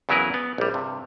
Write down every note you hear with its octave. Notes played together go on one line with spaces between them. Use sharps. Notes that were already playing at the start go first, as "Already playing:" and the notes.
E2 C#3 F#3 E4 A#4 B4
B3
A#1 G3
G2 C3